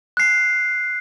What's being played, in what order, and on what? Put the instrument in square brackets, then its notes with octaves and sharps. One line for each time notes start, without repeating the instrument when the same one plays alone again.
[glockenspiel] F#6 C7